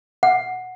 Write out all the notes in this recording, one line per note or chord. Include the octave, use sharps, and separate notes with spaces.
F#5